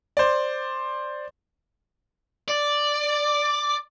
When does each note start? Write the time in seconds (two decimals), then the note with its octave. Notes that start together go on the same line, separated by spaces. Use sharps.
0.17 C5 D5
2.49 D5